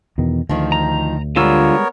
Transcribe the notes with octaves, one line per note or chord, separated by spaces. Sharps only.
E2 B2 D#3
D2 D#3 F3
A#5
D3 G3 G#3 B3 F4 A#4 C#5 E6